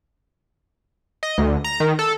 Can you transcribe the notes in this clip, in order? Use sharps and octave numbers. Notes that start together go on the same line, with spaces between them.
D#5
D2
A#5
D#3
A4